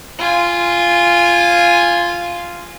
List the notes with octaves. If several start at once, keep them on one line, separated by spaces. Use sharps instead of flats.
F4 G#5